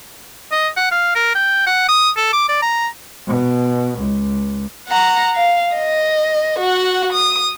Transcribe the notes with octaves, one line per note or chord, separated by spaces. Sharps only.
D#5
F#5
F5
A#4
G5
F#5
D#6
A4
D6
D5
A#5
B2
C#2
F#5 A#5
F5
D#5
F#4 F#5
D#6